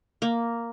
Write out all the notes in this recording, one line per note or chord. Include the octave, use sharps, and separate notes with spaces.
A#3